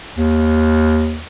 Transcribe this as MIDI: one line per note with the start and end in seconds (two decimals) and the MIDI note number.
0.18 1.22 39